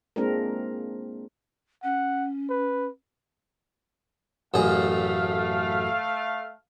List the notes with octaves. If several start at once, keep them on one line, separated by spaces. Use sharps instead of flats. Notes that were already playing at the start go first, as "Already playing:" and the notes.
G#3 A#3 C4 D4 F4 A#4
C#4 F#5
B4
A1 F#2 A3 G#4 F5